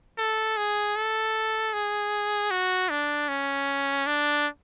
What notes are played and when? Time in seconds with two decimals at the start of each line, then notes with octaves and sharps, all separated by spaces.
0.18 A4
0.57 G#4
0.96 A4
1.74 G#4
2.51 F#4
2.91 D4
3.29 C#4
4.07 D4